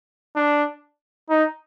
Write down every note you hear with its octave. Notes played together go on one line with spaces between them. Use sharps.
D4
D#4